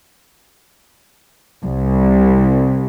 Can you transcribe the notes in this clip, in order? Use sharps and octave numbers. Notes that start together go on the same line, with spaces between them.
C2